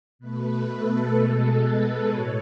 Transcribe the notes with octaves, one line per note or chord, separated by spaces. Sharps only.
B2 A3 B4
A4
B2 G#3 A4
B4
A2 C#5